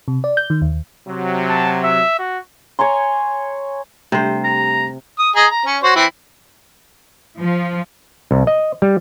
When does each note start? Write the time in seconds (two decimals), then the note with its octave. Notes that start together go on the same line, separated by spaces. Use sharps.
0.08 C3
0.24 D5
0.37 G6
0.50 D#3
0.62 D#2
1.07 C3 F#3
1.50 A5
1.84 E5
2.19 F#4
2.79 C#5 G#5 A#5 C6
4.12 C3 G3 A3 D4 C5
4.44 A#5
5.19 D#6
5.36 G#4 D#5 A#5
5.51 A#5
5.66 C#4
5.83 F#4 C5 C#5
5.96 E3 C4 E4
7.38 F3
8.31 C2
8.47 D#5
8.82 G3